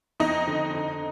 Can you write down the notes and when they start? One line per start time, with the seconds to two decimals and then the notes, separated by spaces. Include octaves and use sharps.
0.20 F2 D#4 D#5
0.47 D3
0.75 D3